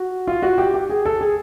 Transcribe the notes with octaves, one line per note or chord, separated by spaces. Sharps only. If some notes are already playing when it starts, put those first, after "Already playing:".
Already playing: F#4
F4
F#4
G4
G4
G#4
A4
G#4